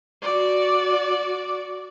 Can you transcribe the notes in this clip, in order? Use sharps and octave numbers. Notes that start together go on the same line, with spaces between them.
F#4 D5